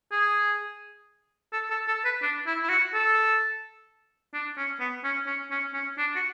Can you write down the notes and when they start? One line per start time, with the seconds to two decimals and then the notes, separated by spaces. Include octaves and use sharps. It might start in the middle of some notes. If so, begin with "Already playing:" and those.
0.12 G#4
1.53 A4
1.71 A4
1.88 A4
2.05 B4
2.23 D4
2.47 E4
2.64 E4
2.69 F#4
2.94 A4
4.34 D4
4.58 C#4
4.80 B3
5.04 C#4
5.27 C#4
5.51 C#4
5.74 C#4
5.98 D4
6.16 F#4